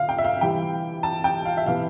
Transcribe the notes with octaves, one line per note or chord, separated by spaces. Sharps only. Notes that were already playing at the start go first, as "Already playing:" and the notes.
Already playing: D3 E5 F5
G5
E5
F5
C3 E3 G3 G5
A5
G5
F5
E5
C3 E3 B3 F5